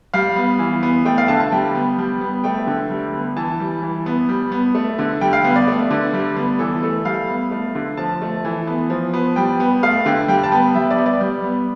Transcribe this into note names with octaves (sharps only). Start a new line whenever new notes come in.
G3 F5
B3
E3
B3
A3 G5
F5
D3 A5
A5
G3 G5
B3
G3
B3
A3 G5
D3
G3
B3
E3 A5
G3
E3
B3
G3
B3
A3
D3
G3 G5
F5
B3
D5
A3
D3
G3
B3
E3 A4
A3 A4
G3 F5
B3
A3
D3
F3 A5
A3
E3
B3
F3
B3
G3 G5
B3
A3 F5
D3 G5
G3 G5
A5
B3 G5
G3 E5
D5
B3
D5
G3
B3